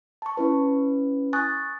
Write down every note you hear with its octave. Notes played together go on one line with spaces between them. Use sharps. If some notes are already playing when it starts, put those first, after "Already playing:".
A5 C#6
C#4 E4 B4
G#5 C#6 D#6 F#6 A6